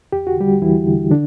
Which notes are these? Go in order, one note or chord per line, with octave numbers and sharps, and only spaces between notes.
E2 G4
F#4
D3 G3 G4
E2 E3 E4
D3
D3 D4